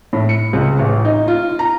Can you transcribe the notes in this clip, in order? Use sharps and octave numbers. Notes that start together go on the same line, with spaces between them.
A2
C#7
C#2
A1
D#4
F4
A#5